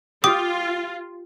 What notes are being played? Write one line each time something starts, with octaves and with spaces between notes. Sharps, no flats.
F4 G4 D#6